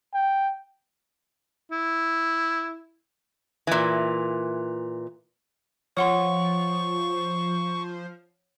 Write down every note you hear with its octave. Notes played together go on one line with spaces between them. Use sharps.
G5
E4
A#2 E3
F3 C#5 F#5 C6 C#6